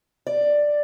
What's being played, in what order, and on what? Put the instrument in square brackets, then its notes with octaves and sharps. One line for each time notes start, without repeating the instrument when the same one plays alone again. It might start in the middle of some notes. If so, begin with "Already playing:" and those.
[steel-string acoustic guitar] D5